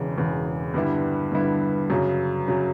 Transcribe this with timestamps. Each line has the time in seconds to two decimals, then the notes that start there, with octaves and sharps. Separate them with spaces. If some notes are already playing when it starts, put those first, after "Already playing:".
Already playing: E1 E2 C#3
0.17 E1 E2 C#3
0.74 G2 D3 G3 B3 E4
1.32 G2 D3 G3 B3 E4
1.90 F#2 C#3 F#3
2.48 C#3 F#3